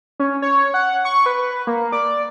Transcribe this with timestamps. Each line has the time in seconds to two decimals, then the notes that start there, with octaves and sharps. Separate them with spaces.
0.20 C#4
0.42 C#5
0.74 F#5
1.05 C#6
1.26 B4
1.67 A#3
1.92 D5